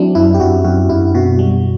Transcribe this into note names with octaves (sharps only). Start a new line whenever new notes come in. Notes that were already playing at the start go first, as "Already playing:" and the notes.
Already playing: F#3 C4 D4 E4
F#2 E4
G4
F#2 F#4
F#2 F#4
F#2 E4
B2 F#4
G3